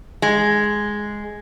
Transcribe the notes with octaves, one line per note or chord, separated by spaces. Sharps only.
G#3